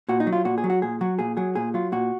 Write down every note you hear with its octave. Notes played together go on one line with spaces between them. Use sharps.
A#2 F#4
D#4
F#3
F4
A#2 F#4
G#4
F#3
F#4
A#2 G#4
F#3 F#4
A#2 G#4
F#3 G#4
A#2 G#4
F#3 F4
A#2 F#4